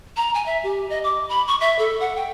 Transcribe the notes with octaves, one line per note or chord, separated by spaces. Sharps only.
A#5
G#5
E5
G4
D#5
D6
B5
C#6
E5
A4
F#5
G5